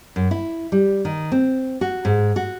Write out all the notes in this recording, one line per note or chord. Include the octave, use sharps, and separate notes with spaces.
F#2
E4
G3
D#3
C4
F#4
G#2
F#4